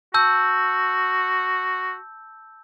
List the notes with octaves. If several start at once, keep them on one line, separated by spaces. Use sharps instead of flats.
F#4 A5 E6 G6